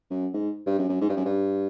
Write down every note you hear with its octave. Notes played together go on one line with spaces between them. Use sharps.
F#2
G#2
G2
F#2
F#2
G#2
G2
F#2
G2